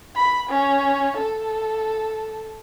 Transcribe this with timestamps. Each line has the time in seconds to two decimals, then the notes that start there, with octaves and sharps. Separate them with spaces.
0.16 B5
0.50 C#4
1.17 A4